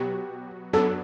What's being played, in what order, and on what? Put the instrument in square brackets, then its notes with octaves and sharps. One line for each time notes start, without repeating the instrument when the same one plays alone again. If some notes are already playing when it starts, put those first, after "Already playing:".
Already playing: [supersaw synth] B2 F#3 B3 F#4 [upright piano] G4
[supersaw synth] F#2 F#3 B3 D4 [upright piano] A4